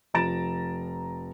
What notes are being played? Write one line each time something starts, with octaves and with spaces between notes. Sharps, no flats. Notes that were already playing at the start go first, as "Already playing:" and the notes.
F1 F3 A#5 A6 D7 E7